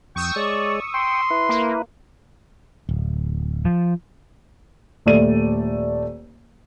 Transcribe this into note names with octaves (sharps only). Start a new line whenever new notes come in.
F2 G5 C#6 D#6 E6
G#3 C#5 D5
G5 C6
E4 B4
A#3
D1
F3
D#1 A3 D5 D#7